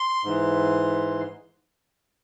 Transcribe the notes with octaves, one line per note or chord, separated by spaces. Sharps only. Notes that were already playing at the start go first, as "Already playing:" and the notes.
Already playing: C6
G#2 E3